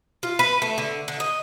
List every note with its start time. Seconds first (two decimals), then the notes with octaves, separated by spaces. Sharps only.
0.23 F4
0.39 B4
0.62 A3
0.78 D3
1.08 D3
1.20 D#5